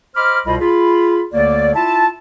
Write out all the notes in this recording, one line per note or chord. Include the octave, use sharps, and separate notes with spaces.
C5 D#5 B5 D6 F6
C2 B2 F4 C5 D#5 B5
F4 G#4 B5
D2 D3 A#3 C#5 D5
E4 F4 E5 A5